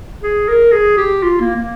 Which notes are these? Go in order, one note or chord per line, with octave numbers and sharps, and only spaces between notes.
G#4
A#4
G#4
G4
F4
A#3
A#3